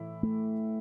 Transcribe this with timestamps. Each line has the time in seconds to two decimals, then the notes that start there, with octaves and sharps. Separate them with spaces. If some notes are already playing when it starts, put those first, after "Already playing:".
Already playing: A2 E3 E4
0.23 A3